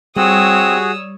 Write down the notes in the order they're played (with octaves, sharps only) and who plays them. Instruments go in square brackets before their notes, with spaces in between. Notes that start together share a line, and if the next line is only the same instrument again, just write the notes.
[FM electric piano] G3 [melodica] C4 [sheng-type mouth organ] F#4 G#4 [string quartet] C#5 D#6 E6